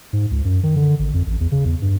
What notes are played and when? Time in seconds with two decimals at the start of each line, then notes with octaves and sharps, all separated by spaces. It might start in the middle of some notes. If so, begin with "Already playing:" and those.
0.13 G#2
0.31 C#2
0.44 F#2
0.63 D#3
0.76 D3
0.99 G#1
1.14 F2
1.26 A1
1.40 E2
1.52 C#3
1.65 E2
1.82 G2